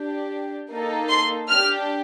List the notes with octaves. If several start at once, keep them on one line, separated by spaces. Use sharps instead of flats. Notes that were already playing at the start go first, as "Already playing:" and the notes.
Already playing: D4 G4
A#3 D#4 A4
C6
D4 G4 F6